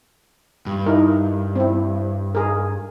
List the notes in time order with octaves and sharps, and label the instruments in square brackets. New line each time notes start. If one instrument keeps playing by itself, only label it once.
[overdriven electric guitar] G2
[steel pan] D#4 E4 A#4
C4 E4
G#4 A#4